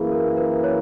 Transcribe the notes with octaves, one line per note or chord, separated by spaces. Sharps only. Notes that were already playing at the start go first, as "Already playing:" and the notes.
Already playing: F#2 E3 A#3 E4 G#4
A#4
B4
C#5